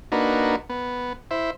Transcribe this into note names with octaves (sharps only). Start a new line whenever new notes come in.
A#3 D4 D#4 F#4 B4
B3
E4 C5 E5